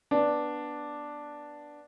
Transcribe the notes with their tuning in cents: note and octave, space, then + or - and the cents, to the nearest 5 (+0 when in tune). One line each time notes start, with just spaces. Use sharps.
B3 -10 D4 +0